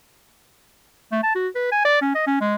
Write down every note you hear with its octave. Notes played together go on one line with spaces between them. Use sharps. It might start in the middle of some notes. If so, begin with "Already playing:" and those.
A3
A5
F#4
B4
G#5
D5
C#4
D#5
C#4
G#3